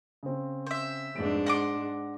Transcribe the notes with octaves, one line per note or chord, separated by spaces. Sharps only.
C#3 C4
C5 E5
F1 G#2 D4 D7
F#5 C6 D6 A#6